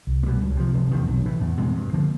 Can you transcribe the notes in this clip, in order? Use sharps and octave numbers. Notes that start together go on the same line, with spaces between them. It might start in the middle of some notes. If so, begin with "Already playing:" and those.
C2
A#3
B2 G3
C#2
C3 F3
F1
E2 C3 D#3
B1
A2 E3
E2
B2 G#3 C4
G2
D3 F3 A#3